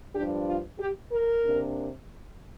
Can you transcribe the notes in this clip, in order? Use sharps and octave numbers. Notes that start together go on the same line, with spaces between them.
G2 F3 D4 G4
F4
G4
A#4
C3 A#3 D4